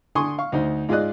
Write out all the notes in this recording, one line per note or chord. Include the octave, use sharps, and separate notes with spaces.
D3 G#5 C6 C#6 D#6
F5 C#6
D2 D#4 C5
G#2 F4 G#4 D5 D#5 F#6